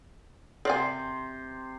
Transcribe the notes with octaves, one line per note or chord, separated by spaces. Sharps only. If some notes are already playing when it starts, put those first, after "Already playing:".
C3 A#4 C5 D5 G#5